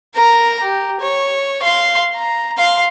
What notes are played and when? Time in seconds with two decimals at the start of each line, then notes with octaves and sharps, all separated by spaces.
0.16 A#4 A#5
0.62 G4
1.01 C#5
1.63 F5 C6
2.16 A#5
2.58 F5 C6